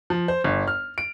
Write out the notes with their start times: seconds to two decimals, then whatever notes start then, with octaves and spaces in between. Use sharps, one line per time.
0.10 F3
0.28 C5
0.44 G1
0.68 F6
0.98 D7